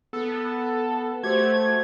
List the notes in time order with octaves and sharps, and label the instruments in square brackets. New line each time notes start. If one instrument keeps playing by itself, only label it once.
[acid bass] B3 [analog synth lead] A4
[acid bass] A3 [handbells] F#4 G4 C5 [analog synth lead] G#6